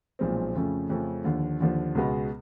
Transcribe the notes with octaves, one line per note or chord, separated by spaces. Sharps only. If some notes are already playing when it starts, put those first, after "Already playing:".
B1 A#2 F3 G#3 C4
F2 C#3 F3 A3 C#4
F2 C#3 F3 A3 C#4
D#2 D3 F3
D#2 D3 F3
C#2 B2 G#3 B3